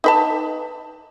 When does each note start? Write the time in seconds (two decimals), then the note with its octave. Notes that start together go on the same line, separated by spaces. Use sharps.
0.04 D#4 B4 A5